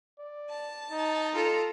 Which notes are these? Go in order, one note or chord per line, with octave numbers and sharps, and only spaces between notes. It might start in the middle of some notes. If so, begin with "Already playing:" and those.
D5
A5
D#4
F4 A4 A#5